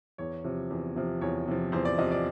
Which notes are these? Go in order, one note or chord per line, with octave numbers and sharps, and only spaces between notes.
E2 C#5
C3 F3
E2
C3 F3
E2 C#5
C3 F3
E2 C5
D5
C3 F3 D#5
D5